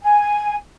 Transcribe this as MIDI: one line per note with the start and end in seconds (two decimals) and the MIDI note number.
0.02 0.55 80